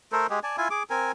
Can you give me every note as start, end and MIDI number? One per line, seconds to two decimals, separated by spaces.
0.12 0.27 57
0.12 0.27 69
0.12 0.27 70
0.12 0.27 72
0.30 0.40 56
0.30 0.40 67
0.30 0.40 68
0.43 0.57 74
0.43 0.57 80
0.43 0.57 81
0.57 0.68 64
0.57 0.68 65
0.57 0.68 80
0.70 0.83 68
0.70 0.83 86
0.90 1.12 60
0.90 1.12 70
0.90 1.12 80